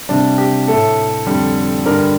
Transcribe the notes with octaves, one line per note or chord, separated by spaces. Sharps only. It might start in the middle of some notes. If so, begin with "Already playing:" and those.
C3 G3 D4
G4
A2 A3 A4
F2 D3 G3
G2 D3 G3 A#4